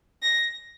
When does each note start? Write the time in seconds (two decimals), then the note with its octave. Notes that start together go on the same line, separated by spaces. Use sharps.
0.23 A#6